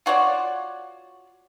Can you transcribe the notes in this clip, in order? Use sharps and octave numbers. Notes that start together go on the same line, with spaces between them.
F4 F#4 C#5 D5